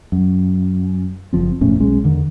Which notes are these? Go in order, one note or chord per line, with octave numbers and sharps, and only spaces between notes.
F#2
F#1 F3 C4
E1 F2 A2 C#4
B1 G#3 C#4
E2 D3 D#3